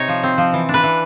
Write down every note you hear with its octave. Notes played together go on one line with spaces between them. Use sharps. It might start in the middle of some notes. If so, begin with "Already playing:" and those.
Already playing: C3 D#4 C#5
F3
C4
F3
E3
D4
B4
E3